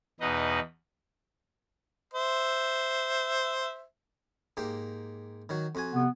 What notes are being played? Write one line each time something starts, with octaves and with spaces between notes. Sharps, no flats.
E2 B2 D#4 B4 D#5
C5 E5
G#2 A#3 G4
D#3 F#3 F#4
F2 F#4 G#5
C3 B3